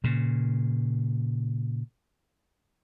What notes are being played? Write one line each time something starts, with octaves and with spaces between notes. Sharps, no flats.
A#2 C#3